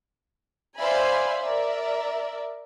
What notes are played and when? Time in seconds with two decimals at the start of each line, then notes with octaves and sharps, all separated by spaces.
0.78 C5 D5 E5 F5 G#5 B5
1.40 A#4 D5 E5